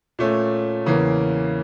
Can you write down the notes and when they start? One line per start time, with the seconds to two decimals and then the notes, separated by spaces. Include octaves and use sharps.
0.19 A#2 A3 C#4
0.86 E2 C#3 E3 A#3